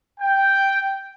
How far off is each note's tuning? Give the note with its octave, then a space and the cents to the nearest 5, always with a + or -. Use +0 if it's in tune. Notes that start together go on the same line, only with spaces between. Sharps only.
G5 +0